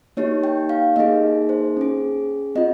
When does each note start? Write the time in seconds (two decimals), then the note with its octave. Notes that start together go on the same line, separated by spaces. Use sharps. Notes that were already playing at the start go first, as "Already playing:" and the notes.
0.17 A#3 D#4 G4 C#5
0.44 G5
0.69 F5
0.96 A#3 D#4 G#4 D#5
1.49 C5
1.77 C#4 G#4
2.55 C4 F4 D#5